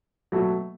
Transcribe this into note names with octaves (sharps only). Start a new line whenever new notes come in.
B2 F#3 A3